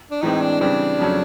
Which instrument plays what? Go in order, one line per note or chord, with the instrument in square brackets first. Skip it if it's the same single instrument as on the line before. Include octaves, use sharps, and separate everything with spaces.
[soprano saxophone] D4
[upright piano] A2 E3 G#3 C4 [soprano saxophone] D#4
[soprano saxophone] D4
[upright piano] C#3 E3 G3 C4 [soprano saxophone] D4
[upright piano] F2 C#3 F#3 A3 C#4